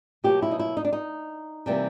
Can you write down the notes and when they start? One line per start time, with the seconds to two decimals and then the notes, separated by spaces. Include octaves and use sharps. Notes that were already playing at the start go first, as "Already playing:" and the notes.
0.24 B2 F#3 A#3 G4
0.42 E4
0.51 D#4
0.59 E4
0.77 D#4
0.85 D4
0.93 D#4
1.66 C3 E3 G3 A#3